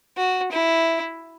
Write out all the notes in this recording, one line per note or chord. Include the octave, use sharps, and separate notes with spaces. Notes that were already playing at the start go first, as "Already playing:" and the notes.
F#4
E4